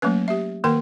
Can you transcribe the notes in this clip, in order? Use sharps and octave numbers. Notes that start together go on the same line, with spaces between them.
F#3 A3 A#3 C#4 B4
G4 E5
D#3 A#3 A#4 G5